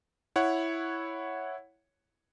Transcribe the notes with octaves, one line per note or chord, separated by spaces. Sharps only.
E4 C#5 F#5